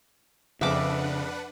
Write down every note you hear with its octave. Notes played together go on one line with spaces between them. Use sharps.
F2 C#3 D4 G#4 B4 E5 F#5 D6